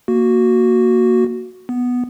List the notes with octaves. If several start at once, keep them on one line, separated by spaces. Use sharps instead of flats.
A#3 F#4
B3